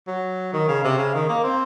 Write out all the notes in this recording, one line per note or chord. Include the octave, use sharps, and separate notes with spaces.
F#3
D#3
C#3
C3
C#3
D#3
A#3
C4